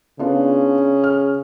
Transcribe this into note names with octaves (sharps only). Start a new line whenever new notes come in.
C#3 B3 D4 F4
F6